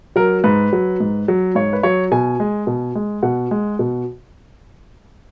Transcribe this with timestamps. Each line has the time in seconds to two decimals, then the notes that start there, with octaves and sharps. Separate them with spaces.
0.16 F#3 A#4
0.44 G#2 B4
0.73 F#3
1.00 G#2
1.28 F#3
1.55 G#2 C#5
1.73 B4
1.83 F#3 C#5
2.12 B2 G#5
2.40 G#3
2.67 B2
2.95 G#3
3.23 B2 F#5
3.51 G#3
3.79 B2